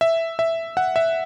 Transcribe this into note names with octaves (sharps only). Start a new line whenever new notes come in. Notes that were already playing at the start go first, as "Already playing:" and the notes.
E5
E5
F#5
E5